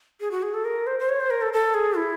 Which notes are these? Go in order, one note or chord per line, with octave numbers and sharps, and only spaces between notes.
G#4
F#4
G#4
A4
A#4
C5
C5
C#5
C5
A#4
A4
A4
G#4
E4